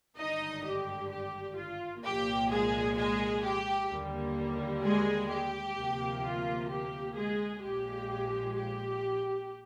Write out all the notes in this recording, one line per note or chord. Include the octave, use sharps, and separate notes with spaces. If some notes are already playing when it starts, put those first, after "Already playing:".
G#1 G2 D3 D#4 D#5
G4
G4
F4
C2 A#2 F3 A#3 G4
G#3 G#4
G#3 G#4
G4
D#2 D3 G3 A#3
G#3 G#4
G4
D2 C3 F3 A#3
F4
G4
G#3 G#4
A#1 A#2 F3 G#3 G4
G4